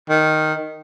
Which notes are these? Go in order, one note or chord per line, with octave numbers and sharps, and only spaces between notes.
D#3